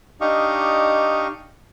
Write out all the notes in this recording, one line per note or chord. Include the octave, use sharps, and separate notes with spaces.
D4 D#4 G4 D#5 F5 C#6